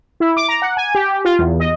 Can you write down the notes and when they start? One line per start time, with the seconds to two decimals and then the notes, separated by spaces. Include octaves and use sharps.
0.20 E4
0.37 D6
0.48 A#5
0.62 F#5
0.77 G#5
0.95 G4
1.25 F4
1.39 E2
1.60 D#5